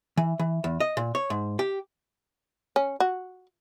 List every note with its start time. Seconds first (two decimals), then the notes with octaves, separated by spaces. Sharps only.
0.17 E3
0.39 E3
0.64 E2
0.80 D#5
0.97 A#2
1.15 C#5
1.30 G#2
1.59 G4
2.76 C#4
3.00 F#4